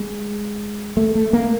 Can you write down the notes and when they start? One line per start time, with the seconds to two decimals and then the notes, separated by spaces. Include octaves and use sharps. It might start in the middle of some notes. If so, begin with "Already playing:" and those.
Already playing: G#3
0.97 A3
1.15 A3
1.33 A#3